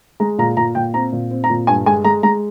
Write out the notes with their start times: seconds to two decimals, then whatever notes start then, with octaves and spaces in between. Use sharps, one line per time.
0.20 G#3 A#5
0.38 A#2 A#5
0.57 A#2 A#5
0.75 A#2 G5
0.94 C4 A#5
1.12 A#2
1.31 C4
1.44 A#5
1.50 A#2
1.67 G2 G#5
1.86 G#3 G#5
2.04 G#3 A#5
2.23 G#3 A#5